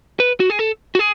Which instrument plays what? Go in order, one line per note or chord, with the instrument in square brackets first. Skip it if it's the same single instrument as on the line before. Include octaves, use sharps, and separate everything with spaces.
[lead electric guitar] B4
F#4
G#4
A4
F#4
G#4